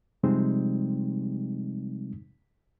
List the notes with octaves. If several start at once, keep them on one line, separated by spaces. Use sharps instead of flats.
C3 F3 G3 G#3 C4 D#4